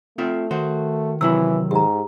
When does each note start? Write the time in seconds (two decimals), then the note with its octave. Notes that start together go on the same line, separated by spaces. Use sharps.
0.18 A3 C4 F4 E5
0.51 D#3 F#4 C5
1.21 C3 E3 F#3 E4 E6
1.71 G#2 G4 A#5